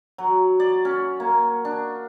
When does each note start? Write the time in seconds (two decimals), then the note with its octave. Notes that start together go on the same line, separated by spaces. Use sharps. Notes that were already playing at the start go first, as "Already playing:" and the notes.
0.18 F#3
0.60 D5
0.85 C#4
1.20 A#3
1.65 D4